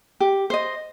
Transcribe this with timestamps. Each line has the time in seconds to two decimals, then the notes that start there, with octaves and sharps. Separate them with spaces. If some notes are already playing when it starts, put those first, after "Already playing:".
0.20 G4
0.50 C5 D#5